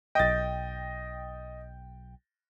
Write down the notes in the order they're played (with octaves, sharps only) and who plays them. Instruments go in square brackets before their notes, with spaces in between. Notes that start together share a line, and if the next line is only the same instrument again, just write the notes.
[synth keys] B1 G5 [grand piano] D#5 A6